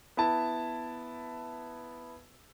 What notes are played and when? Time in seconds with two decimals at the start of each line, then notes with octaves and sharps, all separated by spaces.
0.17 B3 E4 A5